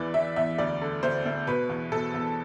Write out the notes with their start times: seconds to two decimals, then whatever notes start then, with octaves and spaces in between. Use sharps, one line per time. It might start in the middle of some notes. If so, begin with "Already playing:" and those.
Already playing: E2 E3 D5
0.14 E3 E5
0.36 E2 E5
0.58 D2 D5
0.81 D3
1.03 D2 C5
1.26 D2
1.47 B2 B4
1.69 E2
1.92 B2 A4
2.14 E2